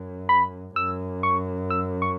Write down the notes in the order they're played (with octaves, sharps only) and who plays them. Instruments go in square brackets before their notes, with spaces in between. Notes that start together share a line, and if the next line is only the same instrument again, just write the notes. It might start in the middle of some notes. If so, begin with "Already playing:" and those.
Already playing: [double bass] F#2
[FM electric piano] B5
[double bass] F#2 [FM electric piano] E6
[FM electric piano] C#6
E6
C#6